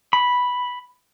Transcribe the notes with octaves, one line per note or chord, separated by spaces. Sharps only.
B5